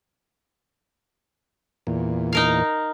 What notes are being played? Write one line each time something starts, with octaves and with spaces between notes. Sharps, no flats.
E2 A#2
D#4 A#4 F5